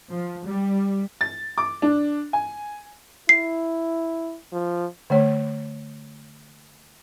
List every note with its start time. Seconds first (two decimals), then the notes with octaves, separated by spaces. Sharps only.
0.11 F3
0.46 G3
1.21 A6
1.58 D6
1.82 D4
2.33 G#5
3.29 E4 C7
4.52 F3
5.10 D3 A3 C#5